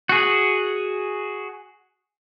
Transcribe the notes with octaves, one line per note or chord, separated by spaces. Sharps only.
F#4 G#4